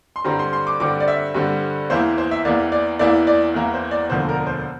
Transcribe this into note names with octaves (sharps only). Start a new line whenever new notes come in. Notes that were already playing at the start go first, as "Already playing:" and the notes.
C6
G2 D3 G3 C4 A#5
C6
C6
D6
G2 D3 G3 C4 D6
D5
E5
G2 D3 G3 C4
E2 E3 A#3 E4 C5
C5
E5
E2 E3 A#3 E4 D5
D5
E2 E3 A#3 E4 D5
D5
E2 E3 A#3 E4 A#4
C5
D5
E1 D2 D3 F3 A#3 C5
A#4
C5